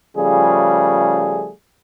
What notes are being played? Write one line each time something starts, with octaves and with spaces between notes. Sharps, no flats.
C#3 F3 G3 A3 F4 G#4